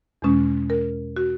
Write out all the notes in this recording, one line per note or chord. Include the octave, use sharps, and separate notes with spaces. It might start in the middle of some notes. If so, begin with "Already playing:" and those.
E2 B2 G#3 C#4
A#4
F#4